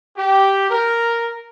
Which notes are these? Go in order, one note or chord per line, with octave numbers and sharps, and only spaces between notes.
G4
A#4